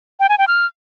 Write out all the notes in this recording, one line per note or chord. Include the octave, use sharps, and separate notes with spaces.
G5
G#5
G5
F6